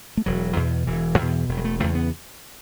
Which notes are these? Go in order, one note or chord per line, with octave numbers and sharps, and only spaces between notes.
A3
E1 F#3
E2 B2
E1 E3
E2 B2
E1
F#3
A3
E2 C#3 A3
B3